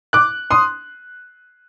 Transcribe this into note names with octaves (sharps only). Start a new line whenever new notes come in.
D6 F#6
C6 D#6